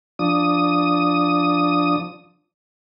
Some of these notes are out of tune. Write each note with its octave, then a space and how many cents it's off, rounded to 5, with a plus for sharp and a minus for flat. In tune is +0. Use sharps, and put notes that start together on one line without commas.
F3 +0 D4 +0 D#6 +0